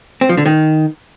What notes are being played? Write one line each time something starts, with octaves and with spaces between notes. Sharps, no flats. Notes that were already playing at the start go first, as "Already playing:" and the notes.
C4
F3
D3
D#3